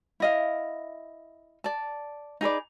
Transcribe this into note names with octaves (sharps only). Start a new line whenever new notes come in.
E4 D#5 F5
D5 A5
D#4 G#4 B4 D5